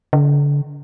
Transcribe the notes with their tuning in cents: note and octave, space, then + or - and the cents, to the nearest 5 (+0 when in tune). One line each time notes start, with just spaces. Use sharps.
D3 -35